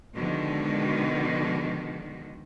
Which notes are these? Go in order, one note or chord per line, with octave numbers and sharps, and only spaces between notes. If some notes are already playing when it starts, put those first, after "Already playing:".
B2 D3 D#3 F3 G#3 F#4